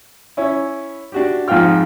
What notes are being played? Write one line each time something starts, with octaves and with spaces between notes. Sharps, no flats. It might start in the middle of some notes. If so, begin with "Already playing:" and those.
C#4 E4
D4 F#4 G4
F2 G#2 F3 F4 G5 F6